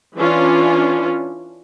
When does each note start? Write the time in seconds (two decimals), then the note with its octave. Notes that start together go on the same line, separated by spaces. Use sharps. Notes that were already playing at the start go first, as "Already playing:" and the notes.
0.16 E3 C#4 D4 F4